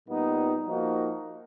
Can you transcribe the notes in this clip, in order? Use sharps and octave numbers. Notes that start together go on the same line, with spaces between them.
A#2 G3 B3 D#4
F3 A#3 D#4 F#4